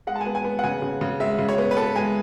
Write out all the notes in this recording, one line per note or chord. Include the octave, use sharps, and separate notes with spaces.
G#3 F#5
A5
G#5
B3
G#5
B3
F#5
C#3 G#5
C#3
C#3
G#3 E5
C#3
C#5
B3
B4
B3 A4
G#3 G#5